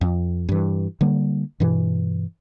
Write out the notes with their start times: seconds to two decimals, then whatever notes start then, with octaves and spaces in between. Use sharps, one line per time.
0.01 F2
0.49 G2 E3
1.01 D3 G3 A#3
1.60 G2 B2 E3